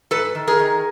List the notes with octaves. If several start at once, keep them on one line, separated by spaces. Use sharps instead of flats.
G#2 A4 B4
D#3
G#4 A#4
D#3